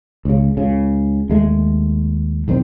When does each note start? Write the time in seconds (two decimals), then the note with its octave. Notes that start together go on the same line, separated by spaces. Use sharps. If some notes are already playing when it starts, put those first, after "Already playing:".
0.25 C#2 C#3
0.57 C#2 C#3
1.30 D#2 G#3 A3
2.48 B1 E2 D#3 C4